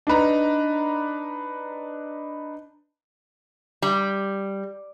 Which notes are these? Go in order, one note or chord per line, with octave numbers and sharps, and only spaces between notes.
D4 D#4 B4 A#5
G3